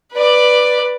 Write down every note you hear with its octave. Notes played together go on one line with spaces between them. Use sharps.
B4 D5